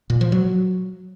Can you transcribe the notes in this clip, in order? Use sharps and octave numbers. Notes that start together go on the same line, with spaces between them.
A#2
F3
F#3